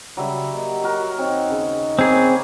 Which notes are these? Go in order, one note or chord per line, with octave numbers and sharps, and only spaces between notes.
C#3 F#3 G3 E5
A#3 G4 D#5
F#4 A#4
D#2 C4 D#4 C#5 D#5
C#3
A#3 C4 G#4 C#5 B5